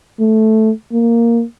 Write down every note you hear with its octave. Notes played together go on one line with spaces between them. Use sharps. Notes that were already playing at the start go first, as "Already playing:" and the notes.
A3
A#3